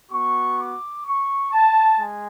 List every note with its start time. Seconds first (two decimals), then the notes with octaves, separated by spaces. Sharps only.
0.11 B3 F#4 C#6
0.58 D6
1.05 C#6
1.52 A5
1.99 G#3 G#5